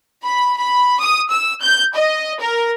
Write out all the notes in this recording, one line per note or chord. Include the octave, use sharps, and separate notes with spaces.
B5
B5
D#6
E6
G6
D#5
A#4